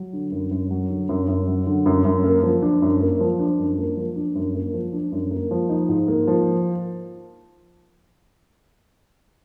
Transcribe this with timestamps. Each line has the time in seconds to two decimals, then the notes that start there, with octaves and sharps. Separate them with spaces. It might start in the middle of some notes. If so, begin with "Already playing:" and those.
Already playing: F#3
0.13 D3
0.32 F#2
0.51 F#2
0.71 F#3
0.89 D3
1.09 F#2
1.28 F#2
1.47 F#3
1.66 D3
1.86 F#2
2.05 F#2
2.24 A#3
2.43 F3
2.62 D4
2.82 F#2
3.01 A#3
3.20 F3
3.39 D4
3.59 F#2
3.78 A#3
3.97 F3
4.16 D4
4.35 F#2
4.54 A#3
4.74 F3
4.93 D4
5.12 F#2
5.31 A#3
5.51 F3
5.69 D#4
5.89 G#2
6.08 A#3
6.27 F3